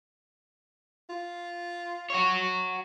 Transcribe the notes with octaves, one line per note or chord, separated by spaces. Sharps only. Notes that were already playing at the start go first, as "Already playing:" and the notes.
F4
F#4 C#5